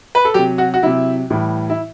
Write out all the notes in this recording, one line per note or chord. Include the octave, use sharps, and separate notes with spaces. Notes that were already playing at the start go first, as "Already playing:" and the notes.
B4
A4
C3 F#3 G4
F#4
F#4
C3 F#3 E4
A2 E3 G3
E4